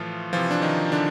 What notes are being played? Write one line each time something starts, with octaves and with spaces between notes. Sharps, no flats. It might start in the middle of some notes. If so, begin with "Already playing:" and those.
Already playing: A2 E3 F3 F4
C3 E3 F3 F4
D4
D#3 D#4
D3 D4